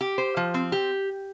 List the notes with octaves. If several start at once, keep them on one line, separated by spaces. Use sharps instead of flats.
G4
C5
F3
C4
G4